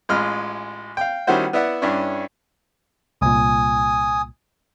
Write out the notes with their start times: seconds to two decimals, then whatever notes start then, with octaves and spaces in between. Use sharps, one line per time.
0.09 A1 G#3 F4 B5 F6
0.97 F5 G5
1.27 D#3 G3 C#4 E4 F#4 C5
1.53 B3 E4 D5 E5 F#5
1.82 G2 C#4 D4 E4 C#5
3.22 C2 A#2 G#5 D#6